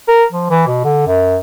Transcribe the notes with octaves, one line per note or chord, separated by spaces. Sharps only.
A#4
F3
E3
B2
D3
F#2